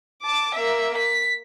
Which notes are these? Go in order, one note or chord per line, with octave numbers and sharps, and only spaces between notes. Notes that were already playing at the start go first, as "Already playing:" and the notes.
A5 D6
A#3 E5
B6